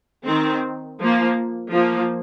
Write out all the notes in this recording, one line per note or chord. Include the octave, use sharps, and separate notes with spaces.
D#3 C4
F3 A#3
F3 A#3